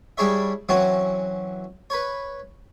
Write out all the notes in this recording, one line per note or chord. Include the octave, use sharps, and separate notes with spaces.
G3 D4 E4 G#4 C#5 E5
E3 F#3 C4 C#4 F#4
B4 C#5